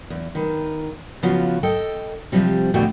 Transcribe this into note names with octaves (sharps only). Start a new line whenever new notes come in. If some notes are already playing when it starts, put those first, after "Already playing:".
E2
D#3 B4
C#3 F3 B3 F4 F#4
A4 D#5 G5
C3 D#3 F3 G3 C4
E2 B2 D3 A3 F#4 G5